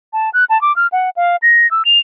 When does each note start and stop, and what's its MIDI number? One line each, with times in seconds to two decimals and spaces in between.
0.13 0.30 81
0.34 0.44 90
0.50 0.60 81
0.61 0.75 86
0.76 0.87 89
0.92 1.10 78
1.16 1.36 77
1.42 1.69 94
1.71 1.83 88
1.85 1.99 101